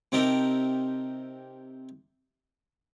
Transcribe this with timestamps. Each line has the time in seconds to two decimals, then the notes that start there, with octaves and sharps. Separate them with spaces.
0.12 C3 C4 D#4 G4 A4 A#4